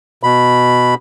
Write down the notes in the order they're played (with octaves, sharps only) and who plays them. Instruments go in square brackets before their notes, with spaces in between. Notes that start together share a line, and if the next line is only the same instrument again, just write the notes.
[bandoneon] B2 B5